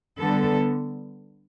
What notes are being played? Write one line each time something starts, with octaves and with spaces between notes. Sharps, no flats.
D3 G3 B3 A4